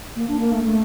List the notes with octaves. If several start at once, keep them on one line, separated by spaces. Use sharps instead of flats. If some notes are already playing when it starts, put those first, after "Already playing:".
A#3
D4
A#3
A3
A3